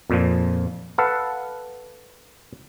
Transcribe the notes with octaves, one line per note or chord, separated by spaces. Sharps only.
F2 A#2 F3
A4 B4 F5 F#5